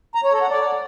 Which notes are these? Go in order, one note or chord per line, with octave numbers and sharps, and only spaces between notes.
A#5
C#5
A4
F#5
D5